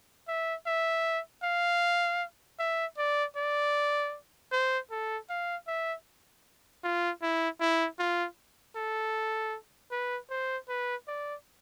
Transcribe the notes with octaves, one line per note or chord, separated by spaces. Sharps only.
E5
E5
F5
E5
D5
D5
C5
A4
F5
E5
F4
E4
E4
F4
A4
B4
C5
B4
D5